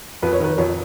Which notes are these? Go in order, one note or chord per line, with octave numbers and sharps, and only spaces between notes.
F2 B4
C#5
D#3 B4
F2 C#5